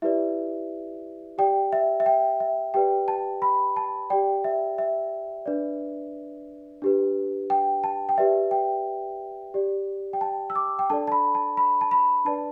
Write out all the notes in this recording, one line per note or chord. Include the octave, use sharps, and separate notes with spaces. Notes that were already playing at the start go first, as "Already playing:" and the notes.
E4 G4 B4 D5 E5
G4 D5 G5
E5
E5
G5
E5
G4 B4 D5 G5
A5
B5
A5
G4 D5 G5
E5
E5
D4 B4 D5
D4 G4 B4
G5
A5
G5
G4 B4 D5 E5
G5
G4 D5
G5
A5
E6
D6
G5
D4 A4 D5 A5
A5
B5
A5
B5
A5
B5
D4 B4 D5 A5